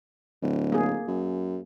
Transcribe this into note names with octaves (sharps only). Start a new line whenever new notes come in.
D1
A#3 G#4
F#2